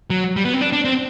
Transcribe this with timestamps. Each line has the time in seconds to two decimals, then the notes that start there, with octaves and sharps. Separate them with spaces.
0.10 F#3
0.36 G3
0.45 B3
0.53 C4
0.61 D4
0.72 D4
0.85 C4